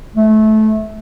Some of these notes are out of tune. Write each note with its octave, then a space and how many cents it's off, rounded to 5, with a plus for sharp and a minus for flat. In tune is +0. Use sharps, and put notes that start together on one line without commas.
A3 -20